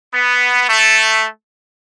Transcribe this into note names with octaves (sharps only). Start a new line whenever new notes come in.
B3
A3